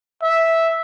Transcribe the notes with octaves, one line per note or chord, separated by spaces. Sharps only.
E5